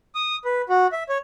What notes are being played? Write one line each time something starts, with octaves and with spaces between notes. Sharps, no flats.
D#6
B4
F#4
E5
C#5